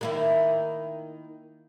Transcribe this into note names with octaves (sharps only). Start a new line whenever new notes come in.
D#3 A#3 E4